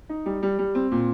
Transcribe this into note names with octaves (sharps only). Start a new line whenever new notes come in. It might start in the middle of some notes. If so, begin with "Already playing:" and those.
D#4
G3
G3
G3
C4
A#2